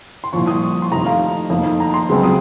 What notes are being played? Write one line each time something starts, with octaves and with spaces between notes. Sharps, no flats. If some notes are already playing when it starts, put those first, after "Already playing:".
C6
C2 A#2 F3 C#6
D#6
C#6
C6
F1 F2 C3 D#3 A#5
F5
F2 D#3 A#3
A#5
C6
C#2 C#3 F#3 C4
D#6